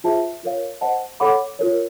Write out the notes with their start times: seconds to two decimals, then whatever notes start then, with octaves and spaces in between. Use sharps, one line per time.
0.04 F4 G#4 C5 E5 A5
0.43 F4 A#4 C#5 F5
0.81 C5 D#5 F#5 A5
1.20 A4 C#5 F#5 B5 D6
1.59 F4 A#4 C#5